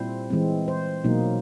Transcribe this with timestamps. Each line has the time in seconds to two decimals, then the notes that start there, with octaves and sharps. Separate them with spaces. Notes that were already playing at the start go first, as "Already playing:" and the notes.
Already playing: A#2 G3 C4 E4 C5
0.30 E3 G#3 C4
0.68 C5
1.04 B2 F#3 A#3 D#4